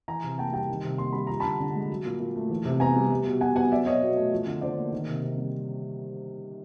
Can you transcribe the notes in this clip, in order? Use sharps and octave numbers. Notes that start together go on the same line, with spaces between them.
E3 G#5 A#5
C3
A#3 G5 A5
G3 G5 A5
D#3
C3
A#3 C6
G3 B5
F3 A#5
D3 A5 B5
D3
G#3
F#3
A#2
A#2
A3
E3
C3
B3 G#5 A#5
G3
G3
B2
B2 F#5 G#5
B3 F#5 G#5
F#3 D5 E5
B2 C#5 D#5
B2
A3
F3
D3
D3 C5 D5
A#3
D#3
C3
C3
G3